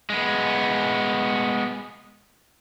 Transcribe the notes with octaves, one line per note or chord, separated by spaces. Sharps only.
G#3 B3